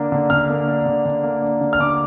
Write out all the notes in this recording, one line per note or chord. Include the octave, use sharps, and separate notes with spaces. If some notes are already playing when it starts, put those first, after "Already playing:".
Already playing: D3 A#3 D4
D3
D3 F6
A#3
D4
D3
D3
A#3
D4
D3
F6
D3 D6